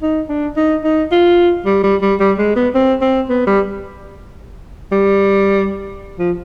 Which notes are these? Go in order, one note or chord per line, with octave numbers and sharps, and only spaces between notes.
D#4
D4
D#4
D#4
F4
G3
G3
G3
G3
G#3
B3
C4
C4
B3
G3
G3
F3